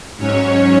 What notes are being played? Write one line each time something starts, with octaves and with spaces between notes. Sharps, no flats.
G#2 F#3 C#4 C#5